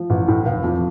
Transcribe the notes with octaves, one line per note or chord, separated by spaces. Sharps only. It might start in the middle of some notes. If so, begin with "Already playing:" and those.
Already playing: F3
A1
A2
F1 F5
F2